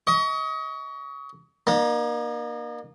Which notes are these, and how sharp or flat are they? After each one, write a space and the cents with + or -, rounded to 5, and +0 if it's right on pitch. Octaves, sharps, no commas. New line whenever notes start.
D#5 +30 C#6 +30
A#3 +25 D#4 -35